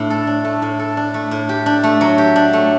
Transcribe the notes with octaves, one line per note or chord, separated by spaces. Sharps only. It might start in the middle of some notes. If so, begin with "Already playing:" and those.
Already playing: A2 A3 D4
A4
D4
A3
A2
A4
D4
A3
A2
G4
D4
A3
F#3
G4
D4
A3